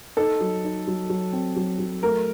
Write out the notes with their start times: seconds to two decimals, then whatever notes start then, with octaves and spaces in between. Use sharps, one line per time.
0.17 D#4 A4
0.40 F#3
0.64 D#4
0.87 F#3
1.10 F#3
1.32 C4
1.56 F#3
1.79 F#3
2.02 A3 A#4